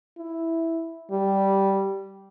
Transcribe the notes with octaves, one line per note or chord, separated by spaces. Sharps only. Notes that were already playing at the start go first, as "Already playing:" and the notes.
E4
G3